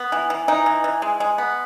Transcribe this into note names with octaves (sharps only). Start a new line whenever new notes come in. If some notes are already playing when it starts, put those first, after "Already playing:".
Already playing: B3
E3
E3
E3 D#4
E3
E3
G#3
G#3
B3